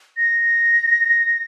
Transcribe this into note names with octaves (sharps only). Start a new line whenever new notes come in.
A#6